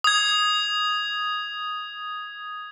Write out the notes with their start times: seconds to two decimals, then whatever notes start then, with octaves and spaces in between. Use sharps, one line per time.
0.04 D#6 G#6